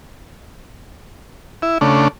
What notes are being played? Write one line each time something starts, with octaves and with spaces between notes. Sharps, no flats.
E4
C#3 A3 D4